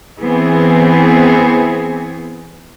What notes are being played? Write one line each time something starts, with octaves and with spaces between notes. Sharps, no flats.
E3 B3 C4 G#4